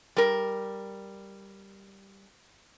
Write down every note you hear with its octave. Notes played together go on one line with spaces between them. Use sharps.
G3 A#4